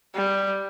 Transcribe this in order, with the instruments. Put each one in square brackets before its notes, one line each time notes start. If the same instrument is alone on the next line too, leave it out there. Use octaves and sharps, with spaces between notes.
[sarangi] G3